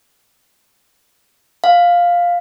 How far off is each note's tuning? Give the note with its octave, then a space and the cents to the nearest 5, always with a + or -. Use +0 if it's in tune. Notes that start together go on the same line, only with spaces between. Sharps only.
F5 +5